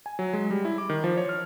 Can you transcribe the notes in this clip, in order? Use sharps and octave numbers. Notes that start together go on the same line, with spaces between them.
G#5
F#3
G#3
G3
E4
D6
D#3
F3
C#5
F6